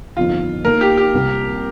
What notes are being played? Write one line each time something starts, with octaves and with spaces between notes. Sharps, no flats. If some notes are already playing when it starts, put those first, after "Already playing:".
G1 F2 D#3 F4
D#2 D#3 A#3 A#4
G4
G4
C2 C3 G3 A#3